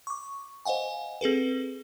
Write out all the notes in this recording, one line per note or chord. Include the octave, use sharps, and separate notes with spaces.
C#6 D6
C5 D#5 F5 F#5 G#5
C4 G#4 A4 B4